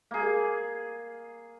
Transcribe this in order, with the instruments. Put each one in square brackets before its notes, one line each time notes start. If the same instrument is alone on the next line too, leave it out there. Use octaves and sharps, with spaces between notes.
[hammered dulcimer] A#3 G#4